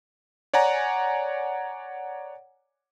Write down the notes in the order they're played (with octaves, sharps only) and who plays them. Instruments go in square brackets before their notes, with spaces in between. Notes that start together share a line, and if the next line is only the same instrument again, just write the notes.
[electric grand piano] C#5 D5 F#5 G#5 A#5